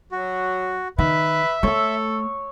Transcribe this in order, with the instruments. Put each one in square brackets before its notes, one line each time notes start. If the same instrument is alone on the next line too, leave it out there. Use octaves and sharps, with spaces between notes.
[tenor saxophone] F#3 [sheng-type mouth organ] F#4
[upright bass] D#3 [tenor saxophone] B4 [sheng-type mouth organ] E5
[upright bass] A3 [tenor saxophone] A4 [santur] C#5 E6